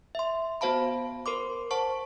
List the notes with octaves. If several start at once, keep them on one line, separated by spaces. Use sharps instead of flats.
E5 C6
B3 F#4 C5 F5 A5 B5
A#4 C5 C6 D6
C5 F#5 A5 C#6